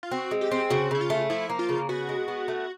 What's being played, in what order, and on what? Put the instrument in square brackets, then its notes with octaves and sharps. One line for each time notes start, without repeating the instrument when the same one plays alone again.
[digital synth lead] F4
[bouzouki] C4 [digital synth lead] F#4
[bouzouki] G#3
[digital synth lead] G4
[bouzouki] C4
[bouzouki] C#3 [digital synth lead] F#4
[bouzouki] C#3 [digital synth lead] E4
[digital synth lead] F4
[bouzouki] A3
[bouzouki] F3 [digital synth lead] E4
[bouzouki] A#3
[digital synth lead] F4
[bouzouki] C#3
[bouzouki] B3 [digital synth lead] F#4
[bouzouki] G#3
B3
A3